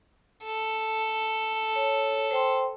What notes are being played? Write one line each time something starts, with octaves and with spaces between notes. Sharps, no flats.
A4
C#5
C5 G5 C6